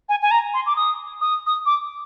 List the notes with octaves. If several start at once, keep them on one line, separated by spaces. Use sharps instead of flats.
G#5
G#5
A#5
C6
D6
D#6
D#6
D#6
D6